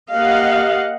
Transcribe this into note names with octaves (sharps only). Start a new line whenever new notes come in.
A#3 G4 D#5 F5 F#5